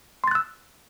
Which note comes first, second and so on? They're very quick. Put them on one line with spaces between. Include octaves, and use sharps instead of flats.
C6 A6 F#6 E6